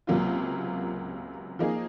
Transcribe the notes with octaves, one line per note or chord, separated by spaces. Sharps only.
C#2 C3 F#3 A#3 F4
F3 A#3 D#4 G#4